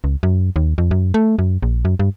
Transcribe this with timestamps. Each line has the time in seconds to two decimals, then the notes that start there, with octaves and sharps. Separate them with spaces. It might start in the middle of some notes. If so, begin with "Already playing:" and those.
0.04 C#2
0.23 F#2
0.56 D#2
0.78 F2
0.91 F#2
1.14 A3
1.39 F#2
1.63 A#1
1.85 F#2
1.99 G2